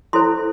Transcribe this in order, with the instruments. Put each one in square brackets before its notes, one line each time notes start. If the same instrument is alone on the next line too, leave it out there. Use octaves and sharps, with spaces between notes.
[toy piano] E4 A4 C5 C6